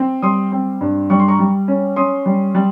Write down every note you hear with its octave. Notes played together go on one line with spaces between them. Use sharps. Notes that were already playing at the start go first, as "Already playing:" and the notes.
Already playing: C4
G3 C6 D#6
C4
G2
G3 C#6
C6
A#5 C#6
G3
C#4
C#4 C6 D#6
G3
G3